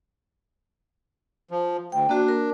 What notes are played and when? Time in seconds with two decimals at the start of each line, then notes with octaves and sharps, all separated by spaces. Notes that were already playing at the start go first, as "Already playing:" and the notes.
1.51 F3
1.92 D2 G5
2.09 A#3 D4 F#4
2.28 A#4